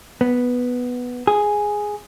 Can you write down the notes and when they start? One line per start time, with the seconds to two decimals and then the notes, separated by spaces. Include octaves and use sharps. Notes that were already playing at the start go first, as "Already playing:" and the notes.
0.21 B3
1.27 G#4